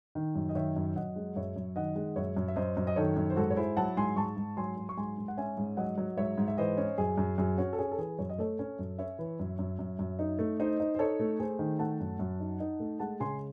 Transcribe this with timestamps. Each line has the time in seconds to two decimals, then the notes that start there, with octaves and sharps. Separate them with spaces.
0.15 D#3
0.35 F#2
0.49 D#5
0.55 D#3 C#5 E5
0.76 F#2
0.96 F#2 D#5 F#5
1.16 G#3
1.36 F#2 C#5 E5
1.56 F#2
1.76 D#3 D#5 F#5
1.96 G#3
2.16 F#2 C#5 E5
2.37 F#2
2.48 E5
2.56 F#2 C5 D#5
2.77 F#2
2.87 D#5
2.96 D#3 A4 C#5
3.16 F#2
3.30 C5
3.36 G#2 F#4 A4
3.50 C#5
3.56 E4 G#4 C5
3.77 F#3 F#5 A5
3.97 G#2 G#5 C6
4.16 G#2 A5 C#6
4.37 G#2
4.57 F#3 G#5 C6
4.77 F#3
4.89 C#6
4.97 G#2 G#5 C6
5.18 G#2
5.28 F#5
5.37 C#4 E5 G#5
5.57 G#2
5.77 F#3 D#5 F#5
5.98 F#3
6.17 G#2 C#5 E5
6.38 G#2
6.48 E5
6.58 E3 C5 D#5
6.77 C#4
6.98 F#2 G#4
7.18 F#2
7.38 F#2 G#4
7.58 C#4 F#4
7.73 A4
7.79 C#4 G#4
7.91 A4
7.98 E3 G#4
8.19 F#2 C#5
8.29 D#5
8.38 A3 A4 C#5
8.59 C#4
8.79 F#2
8.99 C#4 C#5 E5
9.19 E3
9.39 F#2
9.59 F#2
9.79 F#2
9.99 F#2
10.19 D#4
10.39 A3
10.60 D#4 C5 D#5
10.80 D#4
10.95 C5
10.99 D#4 A4 C#5
11.20 A3
11.39 A3 G#4 C5
11.59 D#3
11.79 A3 F#5 A5
12.00 F#2
12.19 F#2
12.40 D#4
12.60 D#4
12.80 A3
13.00 G#3 F#5 A5
13.20 C#3 G#5 C6